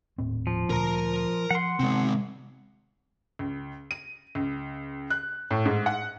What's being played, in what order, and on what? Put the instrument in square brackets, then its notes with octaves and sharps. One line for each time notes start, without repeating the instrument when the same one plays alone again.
[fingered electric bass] D#1 A2 C4
[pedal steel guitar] F3
[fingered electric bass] D2 A#2 [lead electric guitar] A#4 A#5
[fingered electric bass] F3 [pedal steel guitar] F#5 C6
[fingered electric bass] C3 B3 [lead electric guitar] G#3 C4
[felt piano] C#2
D#7
C#2
F#6
A2
G#2
F#5